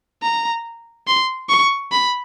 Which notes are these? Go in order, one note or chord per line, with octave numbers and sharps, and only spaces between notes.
A#5
C6
C#6
B5